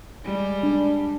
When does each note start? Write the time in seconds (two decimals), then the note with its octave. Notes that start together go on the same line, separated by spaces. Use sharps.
0.23 G3 G#3
0.63 D4